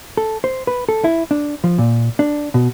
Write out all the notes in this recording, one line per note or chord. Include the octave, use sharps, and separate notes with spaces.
A4
C5
B4
A4
E4
D4
F3
A#2
D4
B2